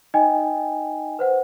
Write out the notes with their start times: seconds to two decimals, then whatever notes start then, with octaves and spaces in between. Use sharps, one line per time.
0.14 D#4 D#5 G5 G#5
1.19 B4 C5 F#5